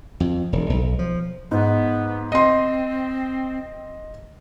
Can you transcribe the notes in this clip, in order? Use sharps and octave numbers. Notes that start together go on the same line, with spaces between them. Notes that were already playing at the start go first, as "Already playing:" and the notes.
F2
E1
B1
F3
G#2 B3
C4 D#5 C6